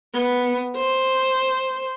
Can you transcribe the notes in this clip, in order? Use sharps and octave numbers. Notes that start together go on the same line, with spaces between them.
B3
C5